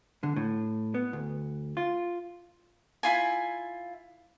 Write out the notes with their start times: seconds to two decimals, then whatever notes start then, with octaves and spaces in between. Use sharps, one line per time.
0.23 D3
0.36 A2
0.94 B3
1.13 D2
1.77 F4
3.03 E4 F4 G#5